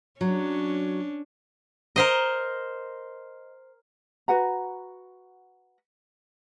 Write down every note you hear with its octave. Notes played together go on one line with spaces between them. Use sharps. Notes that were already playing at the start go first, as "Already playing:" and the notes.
F#3 C#4 D4
A#4 C5 D#5
F#4 B4 F#5 A#5